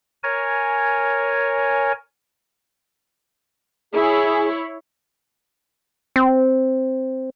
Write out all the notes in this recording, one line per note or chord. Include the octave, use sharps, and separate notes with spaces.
A#4 C#5 G#5
E4 G#4 C#5
C4